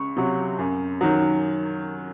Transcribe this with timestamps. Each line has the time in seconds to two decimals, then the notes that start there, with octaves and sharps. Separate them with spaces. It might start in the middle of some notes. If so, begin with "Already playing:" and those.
Already playing: C#2 C#6
0.17 C3 F#3
0.59 F#2
1.01 D#3 F#3